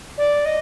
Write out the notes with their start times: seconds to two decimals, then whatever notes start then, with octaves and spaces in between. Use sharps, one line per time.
0.18 D5
0.45 D#5